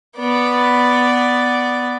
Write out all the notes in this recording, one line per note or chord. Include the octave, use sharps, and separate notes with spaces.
B3 D5